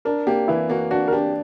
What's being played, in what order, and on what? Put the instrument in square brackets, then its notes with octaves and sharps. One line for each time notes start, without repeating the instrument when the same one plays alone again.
[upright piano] D4 [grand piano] A#4
[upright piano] A#3 [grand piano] G4
[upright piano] E3 [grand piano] E4
[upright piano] A#3 [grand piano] F#4
[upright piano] D4 [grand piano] F#4
[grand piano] A#4
[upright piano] D4 [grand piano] G4